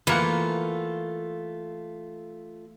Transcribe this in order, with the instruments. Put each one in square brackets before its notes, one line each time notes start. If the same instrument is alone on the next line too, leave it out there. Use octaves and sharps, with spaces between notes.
[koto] E3 A#3 F#5 [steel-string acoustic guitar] A3 F4